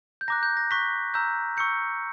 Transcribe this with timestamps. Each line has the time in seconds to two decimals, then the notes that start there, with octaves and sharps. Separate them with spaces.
0.21 G6
0.28 A#5 D6 F#6 A#6
0.43 G6
0.57 A#6
0.71 C#6 F#6 B6
1.14 A#5 E6 G6
1.57 C#6 E6 G6 C#7